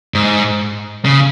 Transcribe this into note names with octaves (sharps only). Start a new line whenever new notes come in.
G#2
C#3